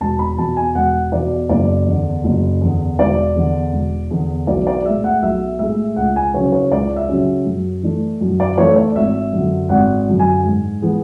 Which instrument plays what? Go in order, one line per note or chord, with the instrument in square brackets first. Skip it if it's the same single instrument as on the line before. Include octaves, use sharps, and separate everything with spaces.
[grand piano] E1 A5
B5
E2 B2 A5
G#5
E1 F#5
E2 B2 D5
F#1 D5
E2
D3
F#1
E2 D3
E1 D5
E2 D3
E1
E2 D3
B1 D5
D5
A2 G#3 E5
F#5
B1 E5
A2 G#3 E5
C#2 F#5
G#5
C#3 F#3 C#4 C#5
C#5
C#2 D5
E5
C#3 F#3 C#4
F#2
E3 A3 D4
F#2
D5
E3 A3 D4 C#5
D5
G#1 E5
F#2 D3
G#1 F#5
F#2 D3
G#5
G#2
E3 G#3 B3